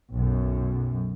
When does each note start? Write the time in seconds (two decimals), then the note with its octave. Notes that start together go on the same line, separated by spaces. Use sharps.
0.13 B1 F#2